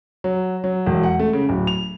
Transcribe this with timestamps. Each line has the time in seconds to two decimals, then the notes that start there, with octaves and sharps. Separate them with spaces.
0.24 F#3
0.64 F#3
0.86 E1
1.03 F#5
1.20 A3
1.33 C#3
1.49 D1
1.67 F7